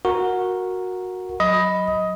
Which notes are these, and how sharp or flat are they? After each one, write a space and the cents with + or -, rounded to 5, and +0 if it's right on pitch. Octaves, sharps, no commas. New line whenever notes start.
F#4 -10 A#4 +0
F#3 +0 D#5 +15 B5 +0